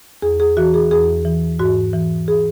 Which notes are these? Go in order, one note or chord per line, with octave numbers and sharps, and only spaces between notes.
E2 G#4
G#4
E3 F#4
G#4
E2 G#4
E3
G#2 F#4
E3
G#4